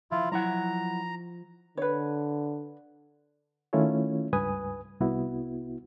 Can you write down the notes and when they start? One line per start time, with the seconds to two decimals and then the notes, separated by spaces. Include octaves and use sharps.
0.11 F3 E4 F4
0.32 F#3 E4 F#5 A#5
1.77 D3 B4 C#5
3.73 D#3 A3 C#4 E4 F4 C#5
4.33 C#2 G2 B4 G#5 D#6
5.00 C2 B3 E4 F#4